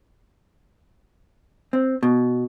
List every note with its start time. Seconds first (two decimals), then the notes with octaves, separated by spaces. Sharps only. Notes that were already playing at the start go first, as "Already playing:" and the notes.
1.73 C4
2.03 B2